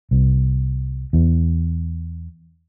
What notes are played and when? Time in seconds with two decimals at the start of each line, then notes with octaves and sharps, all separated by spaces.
0.11 C2
1.13 E2